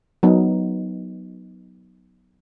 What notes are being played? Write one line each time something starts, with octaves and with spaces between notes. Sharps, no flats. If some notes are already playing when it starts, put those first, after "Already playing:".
F#3 B3 D#4